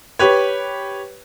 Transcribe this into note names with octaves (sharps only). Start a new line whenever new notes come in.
G4 B4 C#5